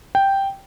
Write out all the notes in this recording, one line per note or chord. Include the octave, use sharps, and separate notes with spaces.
G5